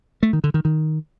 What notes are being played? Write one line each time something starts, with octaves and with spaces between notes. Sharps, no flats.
A3
D#3
D3
D#3
D#3